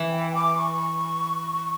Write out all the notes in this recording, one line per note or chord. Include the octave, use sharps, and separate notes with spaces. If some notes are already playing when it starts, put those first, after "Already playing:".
Already playing: E3
G5
D6
C#6